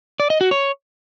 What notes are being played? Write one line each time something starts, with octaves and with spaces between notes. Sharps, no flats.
D5
D#5
F#4
C#5